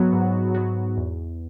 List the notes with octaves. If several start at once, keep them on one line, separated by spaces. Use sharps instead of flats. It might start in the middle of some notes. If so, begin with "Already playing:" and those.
Already playing: G#2 F#3 B3 F#4
G#2
F#3 B3 F#4
E2